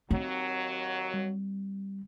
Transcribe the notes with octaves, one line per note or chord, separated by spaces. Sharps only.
D#2 F#3 C4
G3